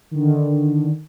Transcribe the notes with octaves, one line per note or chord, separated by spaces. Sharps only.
D3 D#3